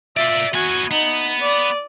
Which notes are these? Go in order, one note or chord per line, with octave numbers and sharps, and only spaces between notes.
F4 D5 E5
B3 F#4 G#5
B3 D#4
D5